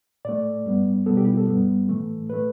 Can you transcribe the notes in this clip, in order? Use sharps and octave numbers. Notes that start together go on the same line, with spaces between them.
A2 A3 D5
G2 G3 B3
B2 G3 B3 A4
G4
E4
A4
G2 G3 B3
A2 E3 A3
A2 A3 B4